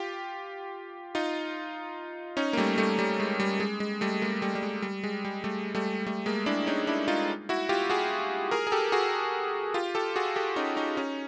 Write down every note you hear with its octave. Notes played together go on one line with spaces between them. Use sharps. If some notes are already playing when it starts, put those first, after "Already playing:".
Already playing: F4 G4
D#4 F4
C#4 D#4
A#3
G3 A3
G3 A3
G3
G#3
G3
G#3
G#3
G3 A3
G#3 A#3
G3 A3
G3
G#3
G3
G#3
G3
G3 A3
G3 A3
G3 A3
G#3 A#3
D4 E4
C#4 D#4
D4 E4
D#4 F4
E4 F#4
F4 G4
F#4 G#4
G#4 A#4
G#4
G4 A4
F#4 G#4
F4 G4
G4 A4
F#4 G#4
G4 A4
C#4 D#4
C#4 D#4
C#4 D#4